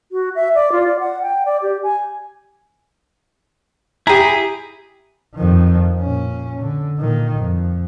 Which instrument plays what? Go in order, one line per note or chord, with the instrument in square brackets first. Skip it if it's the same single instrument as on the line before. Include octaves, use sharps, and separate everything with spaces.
[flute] F#4
E5
D5
F4
D5
F#5
G5
D5
G4
G#5
[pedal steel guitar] E4 G#4 [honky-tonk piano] G4 A#5
[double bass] F2 D#3
A#2 C#4
D3
A#2 D#3
F2